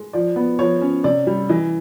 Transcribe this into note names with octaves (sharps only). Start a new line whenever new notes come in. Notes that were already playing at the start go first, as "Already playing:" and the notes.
Already playing: G#3
F3 D5
B3
F3 C#5
C#4
C3 D5
G3
E3 D#5